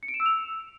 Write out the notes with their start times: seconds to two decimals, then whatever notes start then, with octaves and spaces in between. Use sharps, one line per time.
0.03 C#7
0.08 D7
0.14 E7
0.20 E6
0.26 F7